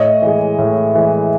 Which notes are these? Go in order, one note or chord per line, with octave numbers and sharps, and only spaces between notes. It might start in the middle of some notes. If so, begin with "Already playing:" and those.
Already playing: A2 C#5 D#5
E3 G#3
A2
E3 G#3